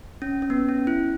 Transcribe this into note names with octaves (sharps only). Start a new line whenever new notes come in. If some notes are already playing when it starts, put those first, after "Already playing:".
C#4
C#4
B3
C#4
E4